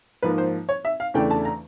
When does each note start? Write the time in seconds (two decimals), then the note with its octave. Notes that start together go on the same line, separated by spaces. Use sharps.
0.22 G#2 F3 A#3 B4
0.38 C5
0.69 C#5
0.85 E5
1.00 F5
1.14 E2 C#3 E3 A3 D4 G5
1.31 A5
1.45 A#5